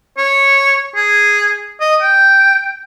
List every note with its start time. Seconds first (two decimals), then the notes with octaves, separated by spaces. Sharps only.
0.18 C#5
0.96 G#4
1.81 D#5
2.02 G5